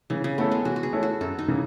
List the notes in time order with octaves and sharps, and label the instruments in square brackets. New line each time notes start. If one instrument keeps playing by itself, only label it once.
[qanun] C#3 [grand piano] E3
[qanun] C#3
[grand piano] A3 C#4 E4 A4 [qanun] B3
[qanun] G#3
[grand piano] E3 [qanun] F#4
[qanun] F#4
G#4
[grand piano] A3 C#4 E4 A4
[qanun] F#4
[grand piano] F#2 [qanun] A4
[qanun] D#4
[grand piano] C#3 E3